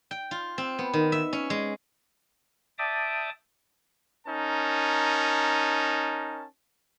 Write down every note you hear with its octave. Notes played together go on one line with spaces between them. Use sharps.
G5
F4
C4
B3
D#3
E5
C#4
G#3
D5 E5 G5 A5 D6 D#6
C#4 D#4 A#4 A5